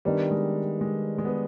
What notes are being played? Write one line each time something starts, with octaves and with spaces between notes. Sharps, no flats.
D#3 G3 B3 D4
G#3
G#3
G#3
B3